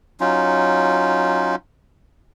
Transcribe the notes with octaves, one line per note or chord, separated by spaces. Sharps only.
F#3 C#4 D#4 F4